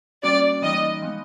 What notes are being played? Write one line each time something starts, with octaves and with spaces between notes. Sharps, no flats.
G3 A#3 C#4 F#4 D5
E3 G3 A#3 D#4 D#5
F3 G#3 B3